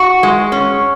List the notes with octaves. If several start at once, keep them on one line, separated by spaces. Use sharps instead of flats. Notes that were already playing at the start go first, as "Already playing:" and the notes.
Already playing: F#4
G#3
C#4